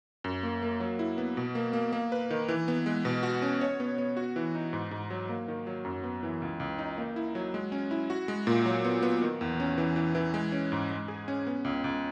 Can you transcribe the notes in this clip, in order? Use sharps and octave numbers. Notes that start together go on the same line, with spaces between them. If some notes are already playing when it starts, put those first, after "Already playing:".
F#2
A#3
A#3
F#3
E4
B3
B2
A#3
A#3
A#3
B4
D#3
E3
B3
G#3
B2
F#4
C#4
C#5
B3
B3
F#4
E3
D#4
G#2
G#2
F#3
A#3
D#3
F#3
F#2
B3
E3
C#2
C#2
D#4
A#3
E4
F#3
G#3
C#4
E4
F#4
G#3
A#2
F#3
B3
B3
D#3
E2
C#4
E3
E3
E3
G#3
C#4
G#2
G#3
G#4
C#4
B3
C#2
C#2